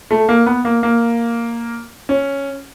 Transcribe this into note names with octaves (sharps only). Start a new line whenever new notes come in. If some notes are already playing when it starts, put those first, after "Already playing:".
A3
A#3
B3
A#3
A#3
C#4